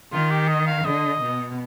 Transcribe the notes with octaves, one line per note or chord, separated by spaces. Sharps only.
D#3 F4
G4
D#5
F5
D3 D#5
B2